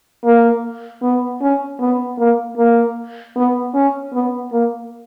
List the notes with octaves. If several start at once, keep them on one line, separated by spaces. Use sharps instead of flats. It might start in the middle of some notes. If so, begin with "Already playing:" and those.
A#3
B3
C#4
B3
A#3
A#3
B3
C#4
B3
A#3